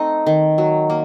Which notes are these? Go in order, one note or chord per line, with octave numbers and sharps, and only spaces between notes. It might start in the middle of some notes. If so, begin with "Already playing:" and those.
Already playing: A3 C4 D#4
D#3
F#3
A#3